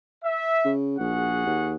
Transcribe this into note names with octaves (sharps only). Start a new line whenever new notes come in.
E5
C#3
A#1 F#4 G#4 F#5
D#2